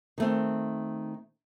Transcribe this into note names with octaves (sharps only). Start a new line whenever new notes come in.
D#3 A3 C4